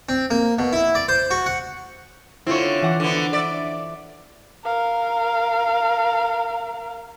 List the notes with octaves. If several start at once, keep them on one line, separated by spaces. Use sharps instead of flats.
C4
A#3
B2
E4
D5
C5
F#4
F#5
D3 C4 E4 F4 C#5
E3 F#5 D6
D3 B3
D5 E5 B6
A#4 F5